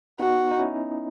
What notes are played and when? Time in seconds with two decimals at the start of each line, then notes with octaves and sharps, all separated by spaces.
0.19 B3 D#4 F#4
0.51 D#4
0.59 C#4 E4